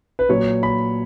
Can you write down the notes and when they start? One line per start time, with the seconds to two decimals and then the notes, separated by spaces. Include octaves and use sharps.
0.19 B4
0.29 A#2 F#3 C#5
0.63 B5